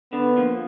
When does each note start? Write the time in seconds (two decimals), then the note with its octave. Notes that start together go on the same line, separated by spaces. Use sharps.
0.12 D3 B3
0.37 F3 A#3